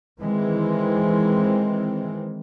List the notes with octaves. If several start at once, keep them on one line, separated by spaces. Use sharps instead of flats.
D#3 E3 G#3 C4